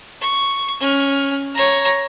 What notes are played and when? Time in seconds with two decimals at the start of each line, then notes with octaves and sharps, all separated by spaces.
0.21 C#6
0.80 C#4 F6
1.54 C#5 A#5